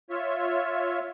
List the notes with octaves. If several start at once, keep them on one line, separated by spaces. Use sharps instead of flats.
F4 C#5 E5